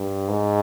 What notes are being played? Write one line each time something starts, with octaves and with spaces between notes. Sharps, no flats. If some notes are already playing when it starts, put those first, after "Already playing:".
Already playing: G2
G#2